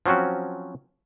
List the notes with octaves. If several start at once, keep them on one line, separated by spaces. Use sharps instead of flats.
F3 F#3 C4 C#4 F#4